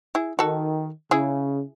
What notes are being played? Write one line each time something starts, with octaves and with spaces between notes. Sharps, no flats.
E4 G#4
D#3 F#4 A4
C#3 E4 G#4